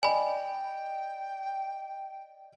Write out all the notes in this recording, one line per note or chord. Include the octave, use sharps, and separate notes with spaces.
D5 D#5 G5 G#5 B5